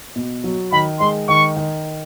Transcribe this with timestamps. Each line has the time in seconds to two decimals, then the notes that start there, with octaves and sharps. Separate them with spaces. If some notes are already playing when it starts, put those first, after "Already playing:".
0.16 B2
0.44 F#3
0.72 D#3 B5
1.00 G#3 C6
1.29 D#3 C#6
1.56 D#3